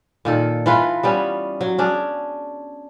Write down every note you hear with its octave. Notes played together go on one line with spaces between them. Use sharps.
A#2 D#3 A4
E3 F4 B4
G3 B3 C#4
F#3
C#4 D4 G#4